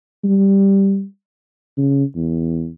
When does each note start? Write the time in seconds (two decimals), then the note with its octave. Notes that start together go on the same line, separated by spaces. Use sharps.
0.24 G3
1.77 C#3
2.16 E2